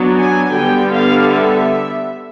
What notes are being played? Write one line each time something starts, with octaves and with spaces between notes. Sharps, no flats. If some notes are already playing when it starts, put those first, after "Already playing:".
Already playing: F#3 B3 D4
G#5
D3 G3 B3 G5
F5
E5